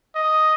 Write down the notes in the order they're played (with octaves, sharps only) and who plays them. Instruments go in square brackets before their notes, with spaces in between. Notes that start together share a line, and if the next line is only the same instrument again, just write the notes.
[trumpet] D#5